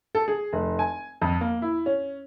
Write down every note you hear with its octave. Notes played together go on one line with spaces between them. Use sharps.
A4
G#4
F1
G#5
F2
A#3
E4
C#4